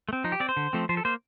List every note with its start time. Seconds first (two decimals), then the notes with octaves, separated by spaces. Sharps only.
0.09 A3
0.13 C4
0.24 F3 D#4
0.32 G4
0.40 C4 D5
0.49 C5
0.57 D3
0.73 F3 A3 C4
0.89 F3 C5
0.97 A4
1.05 A#3 C5